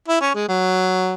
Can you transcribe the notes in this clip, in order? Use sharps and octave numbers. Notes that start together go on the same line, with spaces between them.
E4
C#4
G#3
F#3